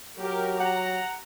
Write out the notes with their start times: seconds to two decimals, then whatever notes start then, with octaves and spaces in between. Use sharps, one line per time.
0.19 F#3 G4 A#4
0.60 F#5 A#5